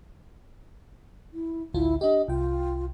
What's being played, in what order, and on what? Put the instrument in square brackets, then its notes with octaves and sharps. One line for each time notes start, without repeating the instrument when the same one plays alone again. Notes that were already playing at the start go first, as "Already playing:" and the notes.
[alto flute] E4
[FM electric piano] A1 D2 F4 [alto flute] E4
[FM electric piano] D4 G4 [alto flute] D#5
[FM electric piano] C2 G5 [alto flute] F4